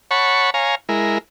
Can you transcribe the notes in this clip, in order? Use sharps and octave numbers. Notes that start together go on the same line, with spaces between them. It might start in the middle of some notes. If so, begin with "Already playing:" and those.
C#5 F#5 A5 B5 C#6
C#5 F5 G#5 A#5
G#3 E4 A#4